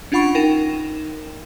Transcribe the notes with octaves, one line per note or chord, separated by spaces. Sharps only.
C#4 D4 F4 F#5 B5 C#6
D#4 A#4 G5 E7